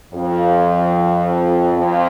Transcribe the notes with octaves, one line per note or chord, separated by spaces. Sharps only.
F2
F2